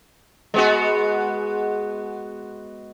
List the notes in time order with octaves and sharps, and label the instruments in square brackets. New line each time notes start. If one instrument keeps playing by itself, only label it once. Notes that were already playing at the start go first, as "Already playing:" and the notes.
[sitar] G#3 B3 F#4